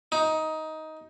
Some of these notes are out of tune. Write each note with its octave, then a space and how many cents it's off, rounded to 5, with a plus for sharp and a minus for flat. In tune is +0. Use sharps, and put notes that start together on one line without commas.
D#4 +15